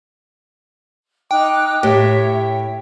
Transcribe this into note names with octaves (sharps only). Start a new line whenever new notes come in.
D#4 G5 D6 F#6
A2 G4 C#5 E5